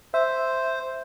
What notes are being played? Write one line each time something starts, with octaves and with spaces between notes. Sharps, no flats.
C5 E5